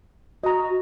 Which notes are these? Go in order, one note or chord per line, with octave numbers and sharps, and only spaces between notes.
F#4 D#5 A#5